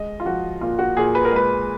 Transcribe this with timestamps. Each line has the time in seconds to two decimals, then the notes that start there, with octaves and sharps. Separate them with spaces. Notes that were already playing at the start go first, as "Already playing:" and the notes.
Already playing: G#3 D#5
0.20 F4
0.25 F3 F#4
0.61 A#2 F4
0.79 F#4
0.96 A#2 G#4
1.15 B4
1.25 A#4
1.32 G#3 B4